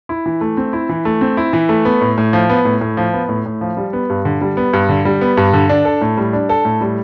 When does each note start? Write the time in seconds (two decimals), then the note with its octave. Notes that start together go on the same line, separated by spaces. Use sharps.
0.09 E4
0.26 E3
0.41 A3
0.57 C4
0.73 E4
0.89 E3
1.05 A3
1.21 C4
1.37 E4
1.53 E3
1.69 A3
1.85 B3
2.01 A2
2.18 A2
2.33 F3
2.50 B3
2.65 A2
2.81 A2
2.97 F3
3.13 B3
3.29 A2
3.46 A2
3.61 F3
3.77 G3
3.93 B3
4.10 G2
4.25 D3
4.41 G3
4.57 B3
4.73 G2
4.89 D3
5.05 G3
5.21 B3
5.37 G2
5.53 D3
5.69 D4
5.85 A4
6.01 A2
6.17 G3
6.33 D4
6.49 A4
6.65 A2
6.81 G3